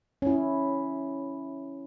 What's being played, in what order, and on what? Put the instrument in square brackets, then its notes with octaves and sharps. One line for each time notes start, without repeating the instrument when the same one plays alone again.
[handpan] C#4 E4